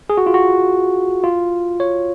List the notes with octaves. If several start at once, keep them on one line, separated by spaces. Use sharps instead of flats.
G#4
F#4
F4
F#4
F4
C#5